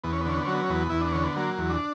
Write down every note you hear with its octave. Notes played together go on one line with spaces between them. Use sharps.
E2 B3
C#4
B3
D3 C#4
B3
F#3 C#4
B3
C#4
E2 B3
E2 E4
D4
D3 C#4
B3
F#3 A#3
E2
D4